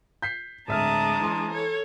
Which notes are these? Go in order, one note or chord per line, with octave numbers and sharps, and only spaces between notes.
G6 B6 C7
D1 G#3 D4 E5 A5 A#5 D#6 F6
E3 C6
A4 C#5